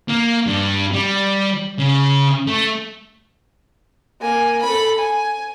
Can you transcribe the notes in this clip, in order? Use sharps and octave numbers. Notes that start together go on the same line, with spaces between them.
A#3
G2
G3
C#3
A3
A#3 G#5
A4 B5
G#5